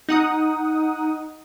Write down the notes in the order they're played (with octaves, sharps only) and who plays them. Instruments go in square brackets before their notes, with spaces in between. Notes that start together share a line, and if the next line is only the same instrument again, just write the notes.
[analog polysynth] D#4 F#5 D#6